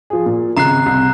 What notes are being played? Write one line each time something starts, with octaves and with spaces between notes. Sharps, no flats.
F3 G#4
A#2
G#1 C#3 A#5 F#6 C7
C2 C7